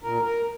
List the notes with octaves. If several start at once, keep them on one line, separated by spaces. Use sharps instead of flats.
A#2 A#4
A#4